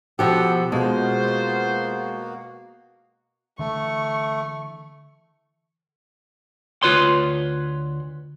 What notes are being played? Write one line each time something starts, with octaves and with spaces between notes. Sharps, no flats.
B2 F3 G4 A4 F#5
B2 G#3 A#3 B3 F4 F#4 C5
D3 E3 A3 C#6
D2 F4 B4 C#5 C6